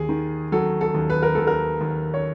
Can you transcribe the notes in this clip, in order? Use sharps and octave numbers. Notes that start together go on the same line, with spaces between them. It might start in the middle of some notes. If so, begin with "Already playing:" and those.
Already playing: D#2 G#4
D#3
F#3 A4
A4
D#2
B4
A#4
D#2 A4
A#4
D#2
C#5